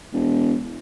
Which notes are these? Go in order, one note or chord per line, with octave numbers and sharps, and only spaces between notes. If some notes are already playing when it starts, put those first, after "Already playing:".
E1